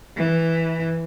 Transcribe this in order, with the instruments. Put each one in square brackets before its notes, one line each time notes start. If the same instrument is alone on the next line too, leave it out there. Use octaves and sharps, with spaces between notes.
[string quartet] E3